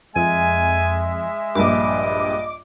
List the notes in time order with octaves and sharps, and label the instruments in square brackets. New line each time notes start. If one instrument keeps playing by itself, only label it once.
[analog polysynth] F2 [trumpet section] G#3 E5 [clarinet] G#5
[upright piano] A#1 G2 [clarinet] D#5 [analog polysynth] D6